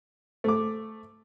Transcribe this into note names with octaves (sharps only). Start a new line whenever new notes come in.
A3 D6